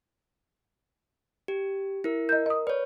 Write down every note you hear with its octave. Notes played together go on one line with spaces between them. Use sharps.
G4
E4 A#4
A#4 D#5 G6
D#5 D#6
B4 C#5 D5